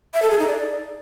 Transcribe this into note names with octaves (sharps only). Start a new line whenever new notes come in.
E5
A4
G#4
D#4
D5